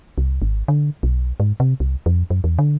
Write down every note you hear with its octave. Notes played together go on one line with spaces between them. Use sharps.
C2
G#1
D3
B1
G#2
C3
C2
F2
F#2
E2
D3